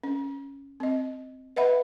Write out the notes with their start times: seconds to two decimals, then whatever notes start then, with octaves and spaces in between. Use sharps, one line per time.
0.03 C#4
0.80 C4 D#5
1.56 B4 D#5 E5 F#5 B5